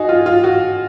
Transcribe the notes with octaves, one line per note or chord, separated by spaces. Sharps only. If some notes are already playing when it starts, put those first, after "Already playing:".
Already playing: D#4 F#4 G#4
F4
F4
F#4